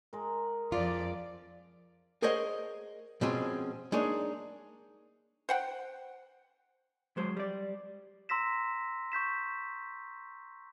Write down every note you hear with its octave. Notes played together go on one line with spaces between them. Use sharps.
G#3 A#4
F2 F4 D5
G#4 A#4 C5 C#5 D#5 F#5
B2 F3 G#3 C4 C#4 G#4
G#3 A#3 D4 D#4 G#4 C#5
C5 F#5 G5
F#3 G#3 C5
G3 D5
A#5 C6 E6 A#6 B6 E7
C#6 G6 B6 E7